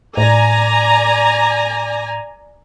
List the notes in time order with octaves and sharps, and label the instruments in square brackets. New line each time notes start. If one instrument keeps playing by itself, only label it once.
[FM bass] A2 [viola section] D5 G#5 A#5